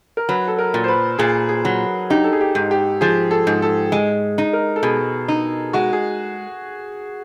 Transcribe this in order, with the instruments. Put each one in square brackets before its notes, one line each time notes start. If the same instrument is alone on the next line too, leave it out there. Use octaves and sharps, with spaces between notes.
[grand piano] A#4
[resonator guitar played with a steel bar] F#3 [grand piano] B4
[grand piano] A4
A#4
[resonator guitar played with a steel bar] A#2
[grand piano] C5
B4
[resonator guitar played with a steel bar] A#2 [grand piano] G#4
[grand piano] G#4
[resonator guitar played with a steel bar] F#3
[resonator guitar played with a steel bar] D#4 [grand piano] G4
[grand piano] A4
G#4
G4
[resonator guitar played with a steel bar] G#2
[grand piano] G4
[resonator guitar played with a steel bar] F3 [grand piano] G#4
[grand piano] A4
[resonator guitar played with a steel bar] G#2
[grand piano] A4
[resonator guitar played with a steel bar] G#3
D#4
[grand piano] A#4
A4
[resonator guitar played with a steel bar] B2 [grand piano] G#4
[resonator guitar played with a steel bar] D#4
[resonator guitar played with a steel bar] G#3 [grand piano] F#4
[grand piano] G#4